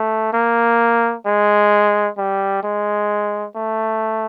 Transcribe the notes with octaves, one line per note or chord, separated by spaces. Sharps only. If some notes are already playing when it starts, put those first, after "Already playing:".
Already playing: A3
A#3
G#3
G3
G#3
A3